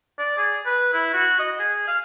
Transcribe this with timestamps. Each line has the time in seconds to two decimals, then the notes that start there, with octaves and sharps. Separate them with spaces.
0.19 D5
0.38 G#4
0.66 B4
0.93 E4
1.14 F#4
1.39 D#5
1.59 G#4
1.88 F5